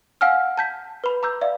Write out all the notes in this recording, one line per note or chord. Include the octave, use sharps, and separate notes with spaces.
F5 F#5 G#5 E6 F6
A5 G6 B6
B4 B5
A#5 D6 E6 G6
D5 E5 F5